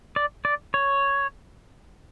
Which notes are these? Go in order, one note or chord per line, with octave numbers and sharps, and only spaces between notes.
D5
D5
C#5